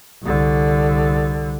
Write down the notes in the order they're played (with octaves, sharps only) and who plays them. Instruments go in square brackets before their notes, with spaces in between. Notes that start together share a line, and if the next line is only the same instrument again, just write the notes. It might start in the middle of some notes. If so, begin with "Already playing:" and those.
[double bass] C2 D3